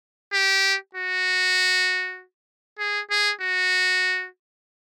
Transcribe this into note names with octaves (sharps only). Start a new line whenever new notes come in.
G4
F#4
G#4
G#4
F#4